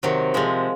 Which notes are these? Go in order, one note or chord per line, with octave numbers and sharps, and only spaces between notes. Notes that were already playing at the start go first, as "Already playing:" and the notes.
C3 D#3 F#3
C3 F3 G#3